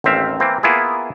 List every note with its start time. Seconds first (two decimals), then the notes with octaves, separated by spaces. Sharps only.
0.04 A1 D#2 C4 E5 F5
0.40 E3 A#3 C4
0.63 A#3 B3 E4 F4 G#4